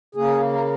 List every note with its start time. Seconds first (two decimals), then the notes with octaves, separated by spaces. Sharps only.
0.15 C#3 A#3 G#4
0.53 A#4